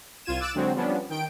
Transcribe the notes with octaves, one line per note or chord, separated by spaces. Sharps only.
C2 F4 G#6 D#7 E7
D6 E6 F#6 A6 D7 E7
D3 F#3 G#3 C4 F#4
F3 G3 B3 C#4 D4
D#3 G5 D7